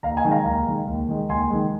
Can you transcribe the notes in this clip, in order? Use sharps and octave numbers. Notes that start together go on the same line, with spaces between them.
D#2 F5 A#5
D#5 G#5
D#3 G#3
F5 A#5
D#2 F5 A#5
D#3 G#3
D#2
D#3 G#3
D#2 G#5 C6
D#3 G#3